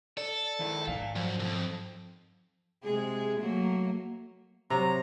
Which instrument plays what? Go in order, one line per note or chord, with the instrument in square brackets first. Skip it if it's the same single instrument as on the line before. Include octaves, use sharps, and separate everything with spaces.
[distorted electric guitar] A4 [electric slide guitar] D5
[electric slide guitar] D#3 E4 D5
[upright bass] G#2 [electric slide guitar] D5 F5
[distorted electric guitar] F#2 [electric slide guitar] F3
[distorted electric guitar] C2 F2
[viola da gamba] C3 G#3 G#4
F#3 A3 A#3
[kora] C3 F#3 [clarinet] A#5